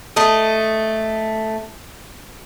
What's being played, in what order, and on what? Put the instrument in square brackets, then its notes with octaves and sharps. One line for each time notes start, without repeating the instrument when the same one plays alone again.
[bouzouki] A3 D#5